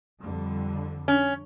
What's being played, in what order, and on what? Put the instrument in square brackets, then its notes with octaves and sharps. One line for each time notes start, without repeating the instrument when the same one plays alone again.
[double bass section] F2 D3 G3
[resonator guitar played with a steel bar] C#4